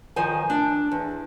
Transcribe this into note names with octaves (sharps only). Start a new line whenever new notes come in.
D#3 F3 C5 G#5
D4
E2